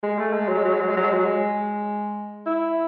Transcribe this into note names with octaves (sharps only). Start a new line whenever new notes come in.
G#3
A3
G#3
F#3
G#3
F#3
G#3
F#3
G#3
F#3
G#3
F#3
G#3
E4